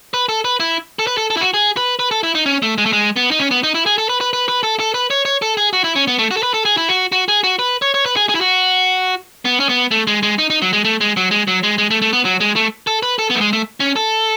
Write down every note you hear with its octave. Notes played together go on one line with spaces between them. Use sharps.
B4
A4
B4
E4
A4
B4
A4
A4
E4
F#4
G#4
B4
B4
A4
E4
D#4
C#4
A3
G#3
A3
G#3
B3
D#4
C#4
B3
D#4
E4
G#4
A4
B4
B4
B4
B4
A4
A4
B4
C#5
C#5
A4
G#4
F#4
E4
C#4
B3
A3
F#4
A4
B4
A4
G#4
E4
F#4
F#4
G#4
F#4
B4
C#5
C#5
B4
G#4
G#4
E4
F#4
B3
C#4
B3
A3
G#3
G#3
D#4
D#4
F#3
G#3
A3
G#3
F#3
G#3
F#3
G#3
G#3
A3
A3
B3
F#3
G#3
A3
A4
B4
A4
B3
A3
G#3
A3
C#4
A4